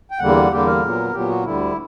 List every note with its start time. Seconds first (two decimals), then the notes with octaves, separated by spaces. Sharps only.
0.11 G5
0.19 E2 D3 G3 A#3 F#5
0.51 E2 D3 G3 A#3 G4
0.67 A#4
0.82 A#2 F#3 B3
1.13 A#2 F#3 B3 G4
1.28 F#4
1.44 D2 D3 G3 E4